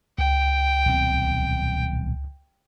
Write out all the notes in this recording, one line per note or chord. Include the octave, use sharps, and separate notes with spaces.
C#2 G5
D#1 B1 C4